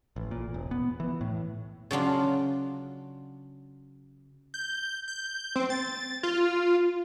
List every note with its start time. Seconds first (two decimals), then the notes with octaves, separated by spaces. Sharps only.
0.16 A1
0.31 A#2
0.54 E1
0.71 B3
1.00 E3
1.21 A2
1.91 C#3 F#3 D4 F4
4.54 G6
5.08 G6
5.56 C4
5.70 A6
6.23 F4